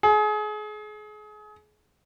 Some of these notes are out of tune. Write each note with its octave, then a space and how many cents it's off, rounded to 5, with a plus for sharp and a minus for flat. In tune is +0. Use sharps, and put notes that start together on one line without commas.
G#4 +30